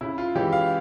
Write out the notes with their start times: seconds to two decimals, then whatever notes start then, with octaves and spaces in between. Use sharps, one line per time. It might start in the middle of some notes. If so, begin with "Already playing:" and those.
0.01 C#3 E4
0.18 F4
0.35 E3 G#3 C#4 G4
0.52 F5